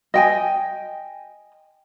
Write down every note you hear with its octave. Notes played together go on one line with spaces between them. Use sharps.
D#5 G5 G#5